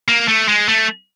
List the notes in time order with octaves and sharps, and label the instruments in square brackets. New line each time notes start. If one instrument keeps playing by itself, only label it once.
[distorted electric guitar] A#3
A3
G#3
A3